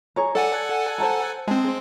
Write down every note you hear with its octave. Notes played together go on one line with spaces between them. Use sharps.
G#4 C#5 A#5
A4 D5 F#5 G#5
C5 A5 A#5
G#3 C4 A5